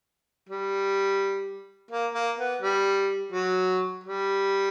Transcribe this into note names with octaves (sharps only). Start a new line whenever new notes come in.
G3
A#3
A#3
B3
G3
F#3
G3